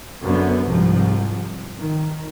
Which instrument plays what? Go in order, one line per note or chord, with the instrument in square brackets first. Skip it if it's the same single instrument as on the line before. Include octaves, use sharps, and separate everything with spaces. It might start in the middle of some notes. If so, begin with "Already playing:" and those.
[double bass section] F#2 D3 B3
C2 G#2 F3
D#3